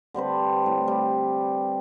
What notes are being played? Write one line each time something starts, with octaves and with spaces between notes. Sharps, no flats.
D3 G3 C4 B4
A2
G3